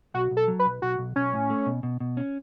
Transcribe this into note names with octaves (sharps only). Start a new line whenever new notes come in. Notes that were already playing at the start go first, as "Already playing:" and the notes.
B1 F#4
B1
A4
F#3
B4
B1
B1 F#4
B1
B1 C#4
A2
A3
B2
B2
B2
C#4